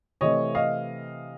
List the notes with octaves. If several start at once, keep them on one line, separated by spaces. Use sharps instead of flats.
C3 E3 A3 C#5 D#5
D#5 F5